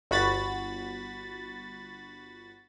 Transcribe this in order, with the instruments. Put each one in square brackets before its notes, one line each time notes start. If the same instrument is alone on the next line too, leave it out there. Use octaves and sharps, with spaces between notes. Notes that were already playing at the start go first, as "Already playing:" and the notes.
[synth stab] G1 F#4 B5 A6